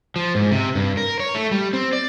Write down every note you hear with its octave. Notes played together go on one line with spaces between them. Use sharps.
F3
G#2
C3
G2
A#4
C#5
A3
G3
C4
D5